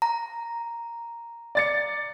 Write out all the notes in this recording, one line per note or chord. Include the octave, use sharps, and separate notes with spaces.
A#5
D5 A6 C#7